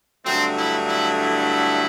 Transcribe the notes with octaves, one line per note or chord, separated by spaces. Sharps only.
G2 D3 F#3 A3 C4
E4
E4
E4